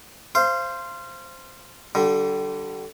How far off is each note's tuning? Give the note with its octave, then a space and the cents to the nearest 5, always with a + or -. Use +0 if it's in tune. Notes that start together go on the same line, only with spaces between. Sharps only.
C5 +0 F5 -25
D3 +0 G3 -35